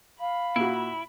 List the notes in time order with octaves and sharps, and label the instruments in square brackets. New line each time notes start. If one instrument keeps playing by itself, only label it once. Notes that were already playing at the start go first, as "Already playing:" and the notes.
[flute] F5 [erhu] B5
[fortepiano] A#2 F#4 [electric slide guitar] E4